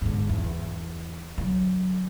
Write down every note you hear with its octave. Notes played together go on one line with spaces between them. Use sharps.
G#2 D3
E2
D3 F#3